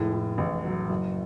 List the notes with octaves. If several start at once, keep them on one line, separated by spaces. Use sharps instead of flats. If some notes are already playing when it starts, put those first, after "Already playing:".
Already playing: F1 A2 G#3
A2
A1
F#3
F#1